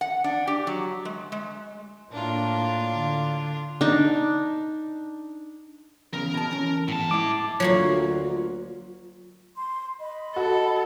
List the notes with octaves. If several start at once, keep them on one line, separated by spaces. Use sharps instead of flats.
F#5
D4
G4
F#3
G#3
G#3
A2 A#3 D4 F4
D3
D4 D#4
E2 C#3 A#4
B2 A5
E3 C#4
E2 A2 A5
G#3 E4 D6
D2 F#3 A#3 F4 F#4 C#5
C6
D#5 B5
F#4 A4